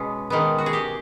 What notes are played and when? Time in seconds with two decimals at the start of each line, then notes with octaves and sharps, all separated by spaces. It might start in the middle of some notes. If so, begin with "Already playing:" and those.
Already playing: B2 G#3 B3 C#4
0.30 D#3 G#3 B3
0.58 F#4
0.66 G#4
0.73 G4